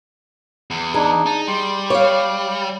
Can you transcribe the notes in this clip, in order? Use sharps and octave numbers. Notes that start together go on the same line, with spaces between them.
E2
D4 D#4 G#4
D#4 A5
G3 C6
G4 C#5 F5